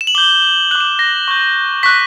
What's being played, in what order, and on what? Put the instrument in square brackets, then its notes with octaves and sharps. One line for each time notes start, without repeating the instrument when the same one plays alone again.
[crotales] E7
F#7
D6 G6 G7
D6 F#6 F#7
E7
A#6
C#6 G6
C#6 F#6 B6